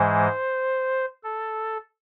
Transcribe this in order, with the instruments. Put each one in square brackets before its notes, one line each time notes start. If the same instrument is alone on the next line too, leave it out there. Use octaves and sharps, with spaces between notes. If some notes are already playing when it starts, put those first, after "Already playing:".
Already playing: [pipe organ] G#2 E3 G#3 C5
A4